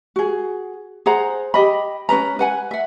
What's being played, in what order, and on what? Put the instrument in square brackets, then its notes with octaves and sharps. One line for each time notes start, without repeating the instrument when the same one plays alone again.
[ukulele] F#4 G#4
G#4 C5 F#5 A#5
G4 D#5 B5
C#4 A#4 B4 A#5
B4 F#5 G#5
E5 F#5